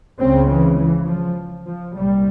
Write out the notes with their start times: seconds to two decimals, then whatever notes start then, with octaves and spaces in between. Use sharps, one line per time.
0.20 C#2 C#3 C4
0.50 E3
0.79 E3
1.08 F3
1.66 F3
1.96 C2 A#2 G3